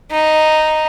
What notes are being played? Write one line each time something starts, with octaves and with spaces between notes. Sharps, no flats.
D#4